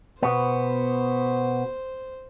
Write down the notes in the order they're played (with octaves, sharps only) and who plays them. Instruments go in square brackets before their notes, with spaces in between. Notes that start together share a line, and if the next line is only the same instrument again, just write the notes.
[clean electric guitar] B2 B3 [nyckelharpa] C5